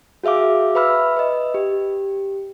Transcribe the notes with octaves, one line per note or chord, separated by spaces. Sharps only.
F#4 G#4 E5 F5 D6
B4 E5 B5 E6 F6
B4 D#5
G4